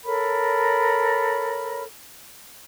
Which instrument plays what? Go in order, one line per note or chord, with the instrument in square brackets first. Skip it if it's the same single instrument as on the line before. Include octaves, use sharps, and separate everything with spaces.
[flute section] A4 A#4 C#5 B5